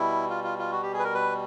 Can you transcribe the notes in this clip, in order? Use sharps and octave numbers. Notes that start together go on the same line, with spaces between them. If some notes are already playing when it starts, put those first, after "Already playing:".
Already playing: B2 G3 E4
F4
F4
F4
F#4
G4
G#4
B4
A#4
B4